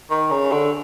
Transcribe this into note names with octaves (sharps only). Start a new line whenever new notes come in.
D#3
C#3
D3